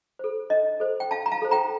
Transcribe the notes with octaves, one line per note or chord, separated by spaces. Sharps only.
A4 C5
D4 D#5
A4 C5
G5
D4 F5 A5
A#5
F5 A5
A4 C5
G5 A#5